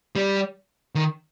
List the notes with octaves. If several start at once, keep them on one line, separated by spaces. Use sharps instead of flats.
G3
D#3